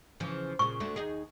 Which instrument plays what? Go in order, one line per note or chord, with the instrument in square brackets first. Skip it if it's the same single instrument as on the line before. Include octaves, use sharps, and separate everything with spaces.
[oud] C#3 E3 F3
[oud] A#2 C#3 [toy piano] C#6
[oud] D2 D3 A3
D#2 D#4 G#4